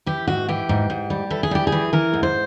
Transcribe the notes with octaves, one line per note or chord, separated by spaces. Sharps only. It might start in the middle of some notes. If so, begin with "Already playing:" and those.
E3 G4
G#2 F#4
E3 G4
G#2
G#2
G3
E3 A4
G#4
G3 G4
G#4
E3
E3 A#4
G#2
C5